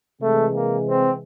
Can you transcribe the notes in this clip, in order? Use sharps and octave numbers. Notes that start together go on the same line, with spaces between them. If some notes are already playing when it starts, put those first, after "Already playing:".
C3 E3 G#3 A3
A#3
C4